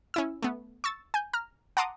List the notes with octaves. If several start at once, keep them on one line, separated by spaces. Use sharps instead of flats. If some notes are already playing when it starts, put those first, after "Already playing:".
C#4 E4 E6
A3 B3
C#6 E6 A6
G#5 G6
A#5 F6
F#5 A5 A#5 C6 D6 D#6